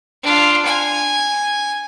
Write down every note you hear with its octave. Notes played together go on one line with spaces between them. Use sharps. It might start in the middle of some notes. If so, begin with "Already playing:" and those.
D4 F4
G#5